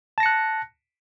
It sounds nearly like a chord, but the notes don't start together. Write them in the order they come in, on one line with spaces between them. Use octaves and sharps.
A5 A#6 C#7 F#6